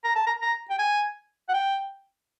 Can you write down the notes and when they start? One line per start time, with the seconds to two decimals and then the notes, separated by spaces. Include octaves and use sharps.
0.04 A#5
0.15 A5
0.26 A#5
0.41 A#5
0.70 G5
0.79 G#5
1.49 F#5
1.54 G5